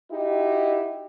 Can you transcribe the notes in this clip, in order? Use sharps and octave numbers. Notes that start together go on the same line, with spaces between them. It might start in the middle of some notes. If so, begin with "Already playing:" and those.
D#4 E4 F#4 G4